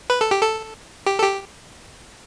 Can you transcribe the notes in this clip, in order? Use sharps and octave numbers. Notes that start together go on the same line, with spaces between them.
B4
A4
G4
A4
G4
A4
G4